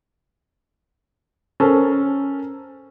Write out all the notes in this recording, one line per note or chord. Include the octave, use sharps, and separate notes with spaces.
C#4 A4 A#4 C5